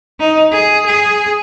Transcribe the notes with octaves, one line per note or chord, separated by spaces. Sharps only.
D#4
G#4
G#4